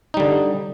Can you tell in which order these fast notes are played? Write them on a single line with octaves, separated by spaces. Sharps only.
D#4 G3 D3